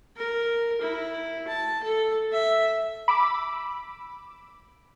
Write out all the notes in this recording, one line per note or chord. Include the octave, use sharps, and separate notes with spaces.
A#4
E4
A5
A4
E5
B5 D6 E6